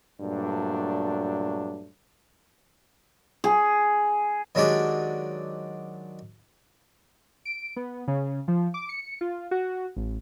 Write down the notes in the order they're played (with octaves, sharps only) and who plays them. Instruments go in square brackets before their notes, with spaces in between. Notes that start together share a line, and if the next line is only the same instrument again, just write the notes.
[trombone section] G2 A#2 F#3 A3 D4
[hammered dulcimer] G#4
[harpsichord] D#3 F#3 G#3 D4 G4 G#4
[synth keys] D7
B3
C#3
F3
D6
C#7
F4
F#4
A1